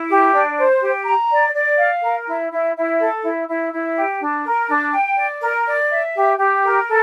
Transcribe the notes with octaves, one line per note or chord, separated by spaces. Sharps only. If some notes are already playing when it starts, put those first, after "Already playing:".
Already playing: E4
G4
D4
C5
G4
A#5
D5
D5
F5
A#4
E4
E4
E4
A4
E4
E4
E4
G4
D4
A#4
D4
G5
D5
A#4
D5
E5
G4
G4
A#4
A4